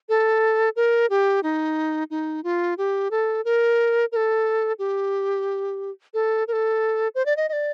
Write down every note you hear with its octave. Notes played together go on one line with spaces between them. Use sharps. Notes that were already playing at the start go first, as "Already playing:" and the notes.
A4
A#4
G4
D#4
D#4
F4
G4
A4
A#4
A#4
A4
G4
A4
A#4
A4
C5
D5
D#5
D#5
D5